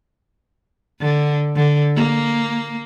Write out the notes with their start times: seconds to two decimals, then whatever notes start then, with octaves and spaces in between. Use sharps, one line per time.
1.01 D3
1.57 D3
1.96 A#3